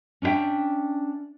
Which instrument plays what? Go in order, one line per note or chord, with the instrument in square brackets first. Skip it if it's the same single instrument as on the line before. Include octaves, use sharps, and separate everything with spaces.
[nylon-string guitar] C#4 D4 E4 E5 G5